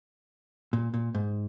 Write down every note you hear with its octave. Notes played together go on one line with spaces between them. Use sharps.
A#2
A#2
G#2